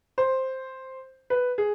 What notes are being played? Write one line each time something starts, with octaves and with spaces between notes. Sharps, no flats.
C5
B4
G#4